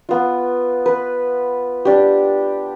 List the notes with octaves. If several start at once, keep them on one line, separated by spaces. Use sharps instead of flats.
B3 F4
B4
D4 G4